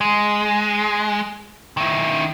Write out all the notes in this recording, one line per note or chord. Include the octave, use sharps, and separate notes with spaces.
G#3
D#3 E4